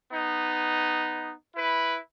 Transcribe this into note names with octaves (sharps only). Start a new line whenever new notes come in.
B3 D#4
E4 B4